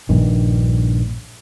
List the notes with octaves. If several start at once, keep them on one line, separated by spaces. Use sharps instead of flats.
A#1 G2 D#3